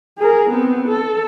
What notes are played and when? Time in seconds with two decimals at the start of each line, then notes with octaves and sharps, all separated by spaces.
0.18 G#4 A#4
0.50 B3 C4
0.88 A4